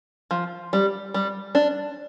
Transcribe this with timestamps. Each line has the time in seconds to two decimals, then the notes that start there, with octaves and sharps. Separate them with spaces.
0.31 F3
0.73 G3
1.14 G3
1.55 D4